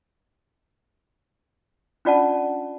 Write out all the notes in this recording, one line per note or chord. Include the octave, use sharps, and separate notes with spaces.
C#4 D4 F4 D5 F#5 A5